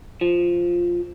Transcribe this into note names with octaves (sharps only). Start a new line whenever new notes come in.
F3